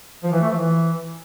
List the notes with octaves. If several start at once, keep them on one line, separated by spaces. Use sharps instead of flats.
F3
E3
A3
F3
E3